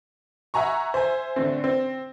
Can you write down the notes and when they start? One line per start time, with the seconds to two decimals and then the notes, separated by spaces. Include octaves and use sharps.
0.54 E5 F#5 G#5 A#5 C#6
0.94 C5 E5 G#5
1.36 D3 A3 C4
1.64 C4